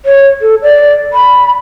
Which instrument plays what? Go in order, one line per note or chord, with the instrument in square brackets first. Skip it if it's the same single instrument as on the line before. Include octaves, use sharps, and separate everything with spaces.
[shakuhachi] C#5
A4
D5
B5